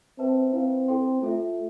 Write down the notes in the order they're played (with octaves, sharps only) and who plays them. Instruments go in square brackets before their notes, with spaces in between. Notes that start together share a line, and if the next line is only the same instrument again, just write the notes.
[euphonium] C4 [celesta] B4 E5 A5
[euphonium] C4 [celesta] E4 B4 F5
[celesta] E4 A4 C5 G5 C6
[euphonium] A3 [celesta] F4 A4 E5